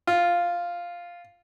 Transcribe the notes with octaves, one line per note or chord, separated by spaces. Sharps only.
F4